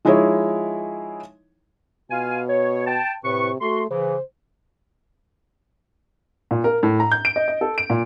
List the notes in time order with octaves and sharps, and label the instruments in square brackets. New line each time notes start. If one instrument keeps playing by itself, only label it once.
[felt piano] F3 G#3 D#4 E4 G#4 C#5
[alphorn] B2 [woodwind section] F4 F5 G#5
[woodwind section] C#5
G5 A5
[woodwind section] A2 B4 C#6 [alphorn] C3
[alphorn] A3 [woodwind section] F#4 C6
[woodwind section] C#3 E3 [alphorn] C5
[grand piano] A#2
A#4
A2
A#5
G6
D7
D#5
D#5
A4
D7
A#2